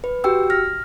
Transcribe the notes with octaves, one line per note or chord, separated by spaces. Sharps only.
B4
F#4 G4 G5 E6
F6 A#6